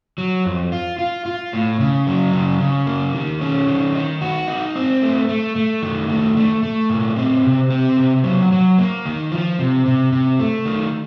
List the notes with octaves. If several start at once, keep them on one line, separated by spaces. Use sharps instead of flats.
F#3
F2
F4
F4
F4
A2
C#3
F#3
C#3
C#3
A#3
D#3
C#4
D#3
D#4
F#4
D#4
C4
A3
A3
A3
D#3
A3
A3
A3
A#2
C4
C3
C4
C3
F#3
F#3
A#3
D#3
F3
C3
C3
C3
A3
D#3